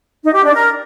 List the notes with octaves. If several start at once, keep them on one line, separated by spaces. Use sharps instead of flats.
D#4
G4
D4
A#4